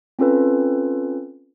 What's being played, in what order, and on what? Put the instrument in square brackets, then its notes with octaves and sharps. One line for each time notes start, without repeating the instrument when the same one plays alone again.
[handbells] C4 C#4 F4 A4 B4